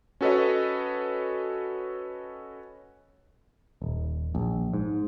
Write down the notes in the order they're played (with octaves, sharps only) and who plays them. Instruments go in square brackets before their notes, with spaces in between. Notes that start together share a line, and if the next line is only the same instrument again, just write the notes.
[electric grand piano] C#4 F#4 A4 B4 C#5 D#5
[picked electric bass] D#1
A#1
G#2